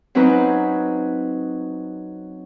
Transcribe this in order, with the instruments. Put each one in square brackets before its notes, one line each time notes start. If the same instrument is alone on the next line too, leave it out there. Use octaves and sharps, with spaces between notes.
[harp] F#3 C4 C#4 D#4 B4